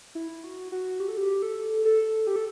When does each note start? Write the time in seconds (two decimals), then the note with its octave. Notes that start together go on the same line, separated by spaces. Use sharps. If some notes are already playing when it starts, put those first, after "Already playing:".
0.15 E4
0.44 F#4
0.72 F#4
1.00 G4
1.08 A4
1.17 G4
1.42 A4
1.85 A4
2.27 G4
2.36 A4